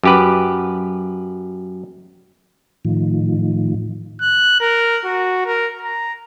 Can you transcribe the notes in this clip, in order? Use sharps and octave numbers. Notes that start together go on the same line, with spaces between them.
F#2 G4 B4
A2 D#3 F3
F#6
A#4
F#4
A#4
A#5